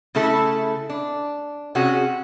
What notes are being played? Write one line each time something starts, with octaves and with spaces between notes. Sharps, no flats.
C#3 A3 E4 A4
D4
C3 C#4 F#4 G#4